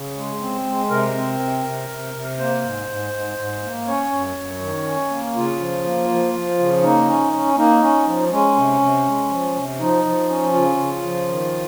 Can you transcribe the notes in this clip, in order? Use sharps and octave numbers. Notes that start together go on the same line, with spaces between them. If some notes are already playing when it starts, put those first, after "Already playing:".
Already playing: C#3
G#3
C4
G#3
C3 A#4
C4
C3
C3
C3
C3
A#3 C5
G#2
G#2
G#2
G#2
A#3
C#4 C#5
F#2
F#2
D#3
C#4
A#3
C#3 F4
F3
A#3
F3
F3
C#3
A#3 D#4
C#4
C#4
A#3 D#4
C#4
F3
G#3 C#4
C3
C3
G#3
F3
C3
F3 D#4
F3
C#4
C#3 F4
C#3
F3
D#3